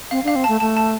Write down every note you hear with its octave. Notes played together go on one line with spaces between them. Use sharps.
C4 F5
D4
F5
C4
A3 A5
A3 A5
A5